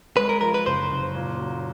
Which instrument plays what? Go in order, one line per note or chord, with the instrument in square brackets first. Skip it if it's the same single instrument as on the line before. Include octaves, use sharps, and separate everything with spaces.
[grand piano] G#3 [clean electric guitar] B4
[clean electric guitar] A#4
[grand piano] F3 [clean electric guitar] A#4
[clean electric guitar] B4
[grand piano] F#1 [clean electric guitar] C5
[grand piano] F#1
A#2
F#3